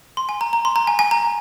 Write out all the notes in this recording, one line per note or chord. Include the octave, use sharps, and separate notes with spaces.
C6
G#5
A#5
A#5
C6
A#5
G#5
G#5
A#5